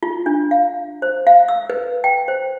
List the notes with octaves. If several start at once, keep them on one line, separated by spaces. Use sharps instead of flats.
F4
D4
F5
C5
F5
E6
B4
G5
C5